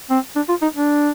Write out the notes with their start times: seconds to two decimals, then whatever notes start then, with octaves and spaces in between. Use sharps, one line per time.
0.10 C4
0.36 D4
0.49 F4
0.62 D#4
0.75 D4